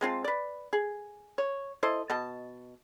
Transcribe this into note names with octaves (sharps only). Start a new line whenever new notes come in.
G#3 C4 F4 A5
B4 D5
G#4
C#5
E4 A4 C5 D#5
B2 D#5 A5